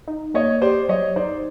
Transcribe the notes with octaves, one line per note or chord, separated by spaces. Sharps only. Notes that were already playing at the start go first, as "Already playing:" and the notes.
D#4
A#3 C#5 D#5
G4 C5 D5
F#3 C#5 D#5
D#4 C5 D5